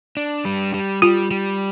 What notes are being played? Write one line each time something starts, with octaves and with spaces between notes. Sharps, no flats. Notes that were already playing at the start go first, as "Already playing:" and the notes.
D4
G3
G3
G3 F4
G3